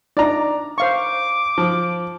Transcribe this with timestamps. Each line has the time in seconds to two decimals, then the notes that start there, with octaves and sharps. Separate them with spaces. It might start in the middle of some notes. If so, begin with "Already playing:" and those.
0.17 D4 D#4 D5 A#5
0.78 C5 F5 C#6 D6
1.58 F3